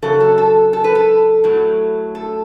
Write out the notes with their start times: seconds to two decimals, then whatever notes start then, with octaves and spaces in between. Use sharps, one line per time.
0.02 F#2 C#3 F#3 A4
0.20 A4
0.38 A4
0.73 A4
0.84 B4
0.95 A4
1.44 A2 F#3
2.15 A4